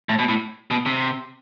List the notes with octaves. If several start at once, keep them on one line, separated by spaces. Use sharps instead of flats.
A2
B2
A2
B2
C3